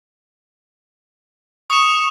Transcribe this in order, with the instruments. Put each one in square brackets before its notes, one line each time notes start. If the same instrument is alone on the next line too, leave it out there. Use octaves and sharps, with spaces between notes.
[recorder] C#6 [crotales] D#6 E7